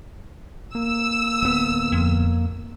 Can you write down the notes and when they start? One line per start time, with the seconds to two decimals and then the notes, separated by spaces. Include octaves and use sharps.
0.75 A#3 E6
1.42 D1 B3
1.92 F2